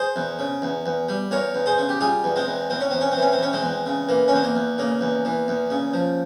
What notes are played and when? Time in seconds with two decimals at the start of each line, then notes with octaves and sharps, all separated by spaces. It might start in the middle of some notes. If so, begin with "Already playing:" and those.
Already playing: G#4 C5
0.16 E2
0.39 C#3
0.62 E2
0.86 E2
1.09 G3
1.31 E2 A#4 C#5
1.55 E2
1.66 G#4 C5
1.78 C#3
1.89 G4
2.01 G3 F4 G#4
2.24 E2
2.36 G#3 C4
2.47 E2
2.70 E2 C4
2.80 C#4
2.91 E2 C4
3.01 C#4
3.12 C4
3.17 E3 C#4
3.32 C4
3.39 E2 C#4
3.53 G#3 C4
3.63 E2
3.86 C#3
4.09 E3 A#3
4.28 C#4
4.32 E2 C4
4.43 A#3
4.56 E2
4.78 C#3 A#3
5.01 E2
5.25 E3
5.48 E2
5.70 C#3
5.94 F3